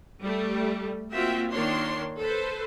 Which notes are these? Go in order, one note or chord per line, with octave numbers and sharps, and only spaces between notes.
G3 A3
A#3 C4 F4 F#4 E5 G5
D#3 A#3 D4 C#5 C6
A4 B4 C5